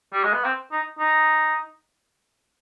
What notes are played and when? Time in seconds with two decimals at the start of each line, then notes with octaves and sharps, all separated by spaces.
0.13 G3
0.24 G#3
0.33 B3
0.44 C4
0.72 D#4
0.99 D#4